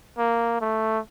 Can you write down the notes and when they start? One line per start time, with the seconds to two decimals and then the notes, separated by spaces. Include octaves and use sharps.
0.18 A#3
0.61 A3